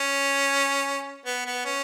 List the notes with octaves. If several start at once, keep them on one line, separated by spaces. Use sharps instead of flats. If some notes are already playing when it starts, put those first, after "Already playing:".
Already playing: C#4
B3
B3
C#4